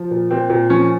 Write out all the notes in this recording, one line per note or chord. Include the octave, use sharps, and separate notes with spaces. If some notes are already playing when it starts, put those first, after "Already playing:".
Already playing: F3
A#2
A#2 C4
A#2
F3 C#4